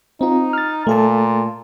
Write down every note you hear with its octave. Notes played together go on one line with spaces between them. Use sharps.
C4 D#4 F4
F6 A6
A#2 A3 A4 A5